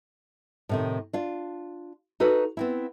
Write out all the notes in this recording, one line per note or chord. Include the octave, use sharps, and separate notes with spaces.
A2 C3 D#3
D4 F4
D#4 F#4 A4 B4
B3 C4 E4